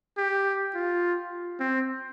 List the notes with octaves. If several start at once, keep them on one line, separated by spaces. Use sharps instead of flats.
G4
F4
C4